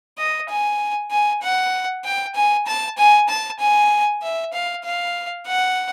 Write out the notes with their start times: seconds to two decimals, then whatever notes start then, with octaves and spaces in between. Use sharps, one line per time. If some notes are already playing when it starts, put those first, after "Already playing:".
0.18 D#5
0.49 G#5
1.11 G#5
1.42 F#5
2.04 G5
2.35 G#5
2.67 A5
2.98 G#5
3.29 A5
3.60 G#5
4.22 E5
4.53 F5
4.85 F5
5.47 F#5